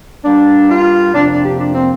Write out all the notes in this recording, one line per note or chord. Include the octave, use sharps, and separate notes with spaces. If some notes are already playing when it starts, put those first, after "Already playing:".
G2 G3 A#3 D4
F4
F2 C3 A#3 D4
D4
G4
D4
C4